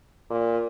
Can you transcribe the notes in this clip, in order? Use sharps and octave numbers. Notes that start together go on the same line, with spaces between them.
A#2